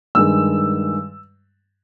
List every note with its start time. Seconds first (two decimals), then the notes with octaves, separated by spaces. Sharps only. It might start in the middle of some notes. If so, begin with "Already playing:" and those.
0.15 G2 D#3 G#3 E6